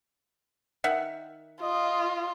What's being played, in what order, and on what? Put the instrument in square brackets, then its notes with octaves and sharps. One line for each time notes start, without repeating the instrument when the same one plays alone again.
[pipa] D#3 E5 F#5
[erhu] F4 [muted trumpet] D#5